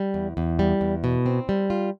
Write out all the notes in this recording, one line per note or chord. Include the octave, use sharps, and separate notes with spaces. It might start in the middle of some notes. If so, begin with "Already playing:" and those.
Already playing: G3
E2
E2
G3
E2
B2
C4
G3
F4